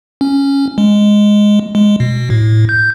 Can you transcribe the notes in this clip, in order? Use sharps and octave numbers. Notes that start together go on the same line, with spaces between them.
C#4
G#3
G#3
B2
A2
G6